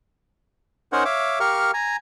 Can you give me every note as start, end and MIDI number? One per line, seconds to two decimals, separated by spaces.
0.93 1.04 61
0.93 1.04 63
0.93 1.04 70
0.93 1.04 72
0.93 1.04 73
0.93 1.04 78
1.05 1.39 73
1.05 1.39 76
1.05 1.39 77
1.05 1.39 86
1.40 1.71 67
1.40 1.71 70
1.40 1.71 77
1.40 1.71 85
1.40 1.71 89
1.74 1.97 80
1.74 1.97 82